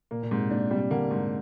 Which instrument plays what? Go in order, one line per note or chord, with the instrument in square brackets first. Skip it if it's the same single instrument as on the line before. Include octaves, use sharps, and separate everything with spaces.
[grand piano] A#2 [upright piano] A#3
[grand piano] A#2
[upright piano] G#2 [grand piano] C3
[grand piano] A#2 [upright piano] D4
[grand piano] C3 [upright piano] G3
[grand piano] D3 [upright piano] A#3
[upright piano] G#2